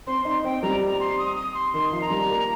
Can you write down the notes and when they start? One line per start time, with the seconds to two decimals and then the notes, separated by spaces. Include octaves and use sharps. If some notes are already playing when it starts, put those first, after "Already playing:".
0.07 C4 C6
0.25 D#4 C6
0.44 C4 G5
0.63 G3 A#5
0.80 A#5
1.00 C6
1.18 D#6
1.37 D#6
1.55 C6
1.74 D#3 C6
1.92 F3
2.01 A#5
2.10 G3
2.29 A#3